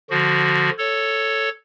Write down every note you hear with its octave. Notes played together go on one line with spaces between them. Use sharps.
D3 F3 F#4
A4 C#5